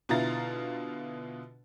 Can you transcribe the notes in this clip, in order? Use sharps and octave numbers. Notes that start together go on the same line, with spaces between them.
B2 D3 E4 F4 A#5 A6